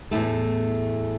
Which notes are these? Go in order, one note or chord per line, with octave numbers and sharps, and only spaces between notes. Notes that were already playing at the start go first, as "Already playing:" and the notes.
E2 A2 C#3 A3